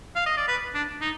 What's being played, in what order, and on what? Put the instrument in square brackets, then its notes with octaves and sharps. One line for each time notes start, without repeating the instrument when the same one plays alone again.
[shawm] F5
D#5
D5
B4
D4
D#4